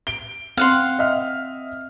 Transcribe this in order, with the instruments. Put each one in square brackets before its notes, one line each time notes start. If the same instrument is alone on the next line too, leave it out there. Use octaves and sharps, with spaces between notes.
[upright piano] D7 G7
[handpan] C4 [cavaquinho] F5 F#5 C6
[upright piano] D#5 E5 F6